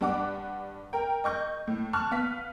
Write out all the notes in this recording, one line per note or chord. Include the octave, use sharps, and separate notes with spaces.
G2 D4 F#5 D6
A#4 G5
D#5 C#6 G6
A2
A5 C#6 F6 F#6
B3 F5 B6